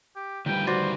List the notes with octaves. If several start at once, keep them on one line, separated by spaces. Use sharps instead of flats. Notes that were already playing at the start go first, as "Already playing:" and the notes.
G4
D2 D#3 F3 G3 B4 G5
F#4 C5 D5